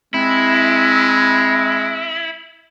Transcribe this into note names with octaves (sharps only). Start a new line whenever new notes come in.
G#3 C4 E4